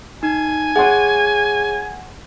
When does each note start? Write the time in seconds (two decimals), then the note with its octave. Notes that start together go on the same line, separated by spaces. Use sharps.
0.23 D#4 G#5
0.76 G#4 C#5 F#5 C6